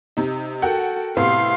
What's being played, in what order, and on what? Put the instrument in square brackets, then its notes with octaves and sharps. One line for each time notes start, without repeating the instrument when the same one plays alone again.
[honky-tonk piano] C3 D#4
[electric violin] F#4 A4 [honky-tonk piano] A#4 F#5 G5
[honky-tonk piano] A2 C3 B3 [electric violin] F5 C6